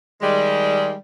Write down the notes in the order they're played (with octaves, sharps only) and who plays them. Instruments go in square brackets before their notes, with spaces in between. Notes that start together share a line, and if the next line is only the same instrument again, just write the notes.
[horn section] D#3 G3 G#3